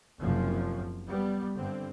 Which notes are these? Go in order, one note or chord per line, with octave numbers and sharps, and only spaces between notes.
F#1 F#2 C3 F3
G3 B3
G2 D3 C4